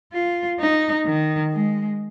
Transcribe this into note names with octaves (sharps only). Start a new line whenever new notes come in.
F4
D#4
D#3
G#3